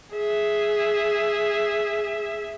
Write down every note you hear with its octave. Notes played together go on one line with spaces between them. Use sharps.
G#4 E5